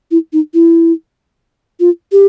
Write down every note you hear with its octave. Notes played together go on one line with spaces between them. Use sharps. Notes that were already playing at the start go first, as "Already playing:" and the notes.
E4
D#4
E4
F4
G4